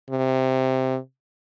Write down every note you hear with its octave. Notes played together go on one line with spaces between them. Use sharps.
C3